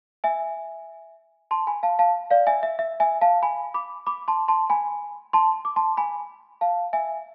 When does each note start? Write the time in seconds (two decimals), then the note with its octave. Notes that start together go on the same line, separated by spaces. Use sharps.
0.24 E5 G#5
1.51 A5 C6
1.67 G#5 B5
1.83 F5 A5
1.99 F5 A5
2.31 D5 F5
2.47 E5 G#5
2.63 E5
2.79 E5
3.00 E5 G#5
3.21 F5 A5
3.43 G#5 B5
3.74 B5 D6
4.07 B5 D6
4.28 A5 C6
4.48 A5 C6
4.70 G#5 B5
5.33 A5 C6
5.65 D6
5.76 A5 C6
5.97 G#5 B5
6.61 F5 A5
6.93 E5 G#5